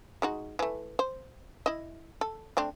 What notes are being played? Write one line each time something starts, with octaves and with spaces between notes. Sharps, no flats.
G#3 D#4 F#4
E3 A3
C5
E4 D#5
A4
A3 C4 D4